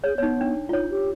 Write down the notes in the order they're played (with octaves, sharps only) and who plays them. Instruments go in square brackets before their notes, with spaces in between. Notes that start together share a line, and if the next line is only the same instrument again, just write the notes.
[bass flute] G#4 [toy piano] C#5
[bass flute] B3 [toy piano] D#4 C#5
[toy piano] D4
[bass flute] D#4 [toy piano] F4 C#5
[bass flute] G4